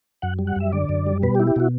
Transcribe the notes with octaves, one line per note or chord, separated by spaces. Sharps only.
F#2 F#5
G3
F#5
F#2 E5
D3 D5
F#2
G3
B2 B4
G4
E4
G4
B2 F#4